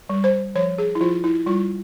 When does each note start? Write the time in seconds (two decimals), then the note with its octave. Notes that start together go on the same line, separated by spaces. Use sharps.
0.09 G3
0.24 C5
0.55 F3 C#5
0.78 G#4
0.95 E4
1.01 F3 F4
1.24 E4
1.46 G3 F4